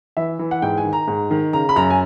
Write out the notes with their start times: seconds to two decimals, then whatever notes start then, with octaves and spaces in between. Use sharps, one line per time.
0.17 E3 E5
0.39 E3
0.51 F#5
0.62 G#2 G5
0.78 G#5
0.85 D#3
0.93 A#5
1.08 G#2
1.31 D#3
1.53 C#3 A#5
1.69 B5
1.76 F#2 A#5
1.90 G#5